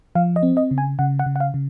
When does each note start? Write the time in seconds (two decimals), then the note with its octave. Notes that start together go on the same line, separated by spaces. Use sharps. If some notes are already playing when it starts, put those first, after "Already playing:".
0.15 F3 F5
0.36 D#5
0.43 C4
0.57 D#5
0.71 C#3
0.78 G#5
0.99 C#3 F#5
1.19 F#5
1.26 C#3
1.36 F#5
1.40 F5
1.54 C#3